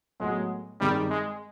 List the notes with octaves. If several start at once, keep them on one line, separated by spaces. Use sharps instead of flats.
A2 F#3 G#3 B3
G2 D#3 G3 G#3 C4 D#4
G#3